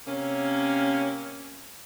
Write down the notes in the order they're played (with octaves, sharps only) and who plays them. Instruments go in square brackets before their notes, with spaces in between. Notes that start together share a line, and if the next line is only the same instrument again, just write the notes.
[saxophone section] C3 A#3 C#4